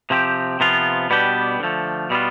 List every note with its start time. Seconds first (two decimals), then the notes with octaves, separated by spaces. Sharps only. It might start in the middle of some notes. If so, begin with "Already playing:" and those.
0.10 C3 F3 C4 G4
0.60 C3 F3 B3 F4
1.10 B2 G3 B3 D4 G4
1.60 D3 F3 A3
2.10 B2 G3 B3 F4